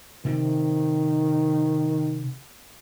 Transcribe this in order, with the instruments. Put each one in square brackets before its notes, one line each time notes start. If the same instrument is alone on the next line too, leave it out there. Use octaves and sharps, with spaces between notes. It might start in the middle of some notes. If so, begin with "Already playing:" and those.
[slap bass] C3 C4 [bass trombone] D#3